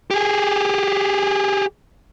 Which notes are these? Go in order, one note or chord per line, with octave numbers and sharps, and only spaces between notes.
G4 G#4